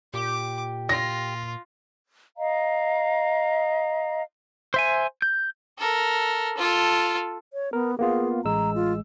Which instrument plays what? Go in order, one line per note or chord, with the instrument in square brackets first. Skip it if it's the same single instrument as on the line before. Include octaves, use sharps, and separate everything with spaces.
[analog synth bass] A#2 [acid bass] G4 [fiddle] D6
[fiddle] F4 [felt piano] A#6
[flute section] D#5 F5 A#5
[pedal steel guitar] C5 E5 G#5
G6
[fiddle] A4 A#4
F4 A4
[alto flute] C#5
[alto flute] B3 [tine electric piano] A#4
[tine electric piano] A#3 B3 F4 [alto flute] G#4
[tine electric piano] A1 G#3 E6 [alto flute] A#5
[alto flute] F4